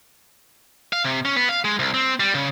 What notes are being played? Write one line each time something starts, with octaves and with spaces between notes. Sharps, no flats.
F5
C3
C#4
B3
F5
G#3
C2
C4
G3
C#3